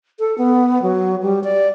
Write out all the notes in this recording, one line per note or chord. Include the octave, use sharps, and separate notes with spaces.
A4
B3
F#3
G3
D5